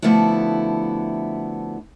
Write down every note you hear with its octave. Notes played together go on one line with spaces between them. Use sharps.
D3 F3 A3 B3 E4 F#4